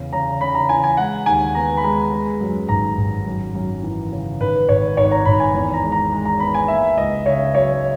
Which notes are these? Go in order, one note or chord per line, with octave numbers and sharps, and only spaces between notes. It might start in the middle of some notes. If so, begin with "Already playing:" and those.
Already playing: E2 C#3
C#3 A#5
C#3 B5
A#5
E3 G#5
G#5
G#3 F#5
D#2 G#5
B3 A#5
B5
G#3 A#5
G#3
F#2
G#1 A#5
G#1
F#2
F#2
E3
C#3
G#1 B4
G#1 C#5
G#1 C#5
A#5
G#1 B5
G#5
E2
A#5
G#3
A#5
G#3
A#5
B3 B5
G#5
A#3 E5
C#2 D#5
C#3 C#5
F#3 C#5